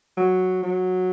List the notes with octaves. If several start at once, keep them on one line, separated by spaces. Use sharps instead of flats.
F#3
F#3